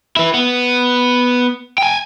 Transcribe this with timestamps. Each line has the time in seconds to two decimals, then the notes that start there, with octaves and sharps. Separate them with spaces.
0.16 E4 B4
0.34 B3
1.78 G5 G#5